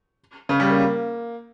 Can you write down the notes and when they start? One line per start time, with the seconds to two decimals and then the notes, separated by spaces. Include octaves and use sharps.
0.49 C#3
0.60 G3
0.70 A#3